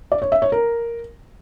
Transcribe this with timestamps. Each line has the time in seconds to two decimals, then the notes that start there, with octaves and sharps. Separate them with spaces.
0.12 D5
0.22 C#5
0.32 E5
0.42 C#5
0.52 A#4